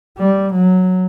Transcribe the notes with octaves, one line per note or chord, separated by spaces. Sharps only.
G3
F#3